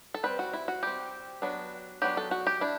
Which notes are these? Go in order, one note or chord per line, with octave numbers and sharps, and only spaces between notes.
A4
G3 C4 B4
F#4
E4
F#4
G3 C4 G4
F#3 B3 D4
F#3 B3 D4 G4
A4
F#4
G4
D4 E4